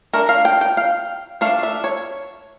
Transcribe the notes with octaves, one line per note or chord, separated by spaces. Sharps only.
A3 D4 A#4
F5
G5
G5
F5
A3 D4 F5
E5
C#5